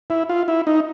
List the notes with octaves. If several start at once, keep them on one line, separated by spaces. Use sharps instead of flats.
E4
F4
E4
D#4